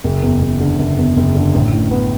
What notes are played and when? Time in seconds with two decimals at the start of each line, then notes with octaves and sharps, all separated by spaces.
0.04 F#1
0.22 E2
0.41 F#1
0.60 D3
0.79 F#1
0.97 E2
1.16 F#1
1.35 D3
1.54 A1
1.72 A2
1.91 B3